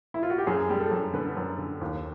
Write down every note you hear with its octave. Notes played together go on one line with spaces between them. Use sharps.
E4
F4
F#4
G4
F#2 G#4
G3
A4
F#2
D3 B4
F#2
D3
D#2